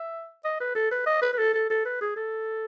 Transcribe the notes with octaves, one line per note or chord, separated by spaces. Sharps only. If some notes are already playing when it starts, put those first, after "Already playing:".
Already playing: E5
D#5
B4
A4
B4
D#5
B4
B4
A4
A4
A4
B4
G#4
A4